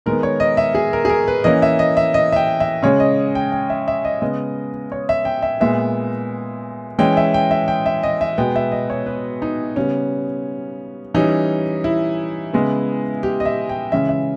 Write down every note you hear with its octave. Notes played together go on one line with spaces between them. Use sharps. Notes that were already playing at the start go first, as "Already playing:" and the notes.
D#3 G#3 B3 A#4
C#5
D#5
E5
G#4
A#4
G#4
A#4
B4
E3 A#3 C#4 D#5
E5
D#5
E5
D#5
E5
G5
E5
C#3 G#3 C#4 C#5
D#5
G5
G5
E5
E5
D#5
C#3 G#3 B3 D#5
C#5
E5
G5
E5
A#2 G#3 B3 E5
E3 G#3 C#4 G5
E5
G5
E5
G5
E5
D#5
E5
B2 G#3 B3 G5
E5
D#5
C#5
B4
D#4
C#3 G3 B3 C#4
E3 G3 C#4 D#4
E4
C#3 G#3 B3
G4
D#5
E5
G5
C#3 E3 G#3 C#4 E5
E5